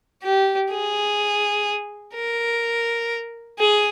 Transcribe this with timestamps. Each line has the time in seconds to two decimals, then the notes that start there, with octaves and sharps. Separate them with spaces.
0.23 G4
0.71 G#4
2.15 A#4
3.60 G#4